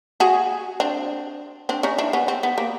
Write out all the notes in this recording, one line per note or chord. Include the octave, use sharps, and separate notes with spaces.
F#4 G#4
C4 D4
C4 D4
C#4 D#4
D4 E4
B3 C#4
C4
B3
A#3